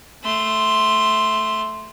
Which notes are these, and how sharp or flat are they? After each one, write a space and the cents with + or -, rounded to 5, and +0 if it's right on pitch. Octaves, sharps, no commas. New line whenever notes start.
A3 +0 C6 +0